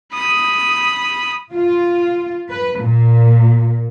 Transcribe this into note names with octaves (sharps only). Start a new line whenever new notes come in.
B5 D#6
F4
B4
A#2